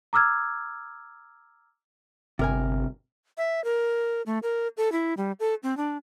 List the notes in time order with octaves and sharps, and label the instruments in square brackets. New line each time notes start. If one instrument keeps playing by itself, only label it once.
[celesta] A#5 D6 E6 F6 G#6
[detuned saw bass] G1 [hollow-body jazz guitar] C3 A#4 G#5
[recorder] E5
A#4
A3
A#4
A4
E4
G3
A4
C4
D4